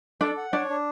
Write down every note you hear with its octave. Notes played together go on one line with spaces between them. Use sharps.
D4 A4
F#5
D4 C#5
D4